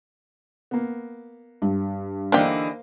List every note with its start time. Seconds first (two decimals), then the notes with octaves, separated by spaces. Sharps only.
0.71 A#3 B3
1.62 G2
2.32 D3 E3 A#3 D4 D#4 G4 C5 F5